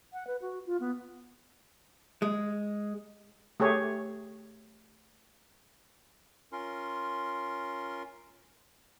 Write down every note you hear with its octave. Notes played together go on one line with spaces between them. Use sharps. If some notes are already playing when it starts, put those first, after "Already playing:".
F#5
B4
F#4
F4
B3
G#3
A3 G4 G#4 C#5
C#4 F4 A#4 C6